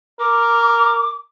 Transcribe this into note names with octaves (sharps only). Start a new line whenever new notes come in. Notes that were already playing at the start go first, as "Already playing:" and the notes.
A#4 D6